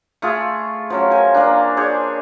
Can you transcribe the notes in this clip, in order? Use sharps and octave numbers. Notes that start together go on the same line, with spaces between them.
A3 F4 G#4
F3 F#3 C#4
A#4 C5 G#5
A#3 D4
D4 G#4 C5 C#5